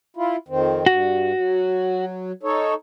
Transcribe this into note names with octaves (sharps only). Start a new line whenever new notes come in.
E4 F4
F2 D#3 C4
G2 F#4
F#3
D#4 A4 C#5